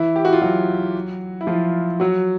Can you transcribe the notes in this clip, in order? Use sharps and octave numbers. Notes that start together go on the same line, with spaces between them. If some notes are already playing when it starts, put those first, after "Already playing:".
Already playing: E3 E4
G4
F#4
F4
F#3 F#4
E4
F3 F4
F#3 F#4